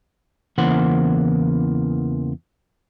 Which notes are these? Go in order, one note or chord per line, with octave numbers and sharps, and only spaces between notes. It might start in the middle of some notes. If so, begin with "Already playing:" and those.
E2 C#3 E3 A#3 C5 F#5